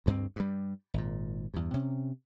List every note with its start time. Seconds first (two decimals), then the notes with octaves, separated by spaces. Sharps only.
0.06 D2 G2 A#3 C4
0.36 G2 G3
0.94 G#1 A#2
1.54 E2 G2
1.74 C3 C#4